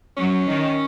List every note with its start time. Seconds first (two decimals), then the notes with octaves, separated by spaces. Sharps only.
0.17 F#3 C#4
0.46 D#3